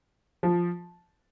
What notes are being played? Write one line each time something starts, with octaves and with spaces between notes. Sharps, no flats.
F3